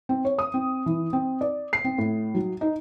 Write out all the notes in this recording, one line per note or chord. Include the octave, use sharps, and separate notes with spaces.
C4
C#5
D#6
C4
E3
C4
D5
C7
C4
A2
F#3
D#4